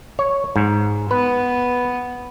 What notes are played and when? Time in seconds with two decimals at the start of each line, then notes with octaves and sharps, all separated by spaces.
0.19 C#5
0.56 G#2
1.11 B3 B4